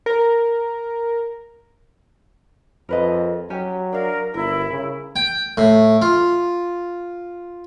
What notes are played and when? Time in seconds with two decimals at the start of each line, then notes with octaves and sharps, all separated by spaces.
0.06 A#4
2.89 F2 A#4 B4 D#5
3.50 F#3 C#4 G4 G#5
3.93 D4 A#4 F5
4.34 G1 E4 A#4
4.70 C#3
5.16 G5
5.57 A2
6.02 F4